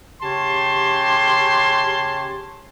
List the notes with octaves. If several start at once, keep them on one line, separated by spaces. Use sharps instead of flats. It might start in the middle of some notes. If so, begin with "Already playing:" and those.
C#3 G4 C#5 A5 C6